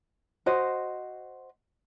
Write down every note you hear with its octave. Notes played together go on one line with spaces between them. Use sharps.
F#4 C5 D#5